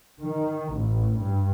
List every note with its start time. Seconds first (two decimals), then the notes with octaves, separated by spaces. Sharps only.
0.19 D#3
0.75 A1
1.18 G2